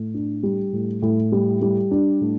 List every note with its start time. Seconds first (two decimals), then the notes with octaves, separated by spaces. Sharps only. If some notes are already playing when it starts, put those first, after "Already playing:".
Already playing: A2
0.14 D4
0.43 G3
0.73 A2
1.02 A2
1.32 G3
1.62 G3
1.91 D4
2.21 A2